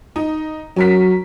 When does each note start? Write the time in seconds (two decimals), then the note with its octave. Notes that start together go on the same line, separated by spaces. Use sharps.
0.16 D#4
0.76 F#3 C#4 A#4 B6